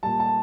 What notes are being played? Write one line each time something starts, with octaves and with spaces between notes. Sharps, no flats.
A#2 G3 A5
A5